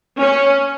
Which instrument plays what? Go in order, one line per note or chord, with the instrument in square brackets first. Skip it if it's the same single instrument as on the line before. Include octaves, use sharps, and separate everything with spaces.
[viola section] C#4